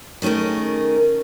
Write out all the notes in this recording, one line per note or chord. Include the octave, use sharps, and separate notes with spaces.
D#3 A3 C#4 G#4 A#4